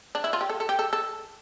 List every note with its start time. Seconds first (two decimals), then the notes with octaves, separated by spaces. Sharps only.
0.15 D4
0.24 E4
0.33 F4
0.41 G4
0.50 A4
0.60 A4
0.69 G4
0.79 A4
0.93 A4